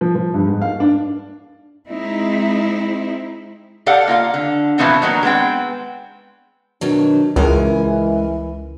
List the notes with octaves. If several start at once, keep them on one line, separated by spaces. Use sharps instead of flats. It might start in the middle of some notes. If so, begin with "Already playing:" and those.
F3
F3
G2
G#2
F5
D4
G#3 C4 D#4 E4
G4 A4 D5 F5 F#5
A#3 F4 F5
D3
B2 E3 F3 A3 B3 C4
D#3 F#3 A#3 D4
G#3 B3 C4 G5
B2 D#3 F#3 D4
C#2 E3 G#3 A#4 G#5